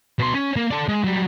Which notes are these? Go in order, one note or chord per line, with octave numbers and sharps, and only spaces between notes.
B2 C6
C#4
A#3
A4 D5
G#3
F#3 G3